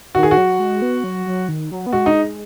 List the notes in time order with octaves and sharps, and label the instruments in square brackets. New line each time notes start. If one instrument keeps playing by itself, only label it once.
[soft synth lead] D#3 [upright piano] F#4
[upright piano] G#4
F#4
[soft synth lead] F#3
G#3
B3
F#3
F#3
D#3
F#3
B3
[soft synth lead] G#3 [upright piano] F#4
[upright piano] D#4